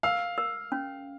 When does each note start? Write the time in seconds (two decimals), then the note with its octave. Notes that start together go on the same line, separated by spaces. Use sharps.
0.03 A#4 F5
0.38 A#4
0.72 C#4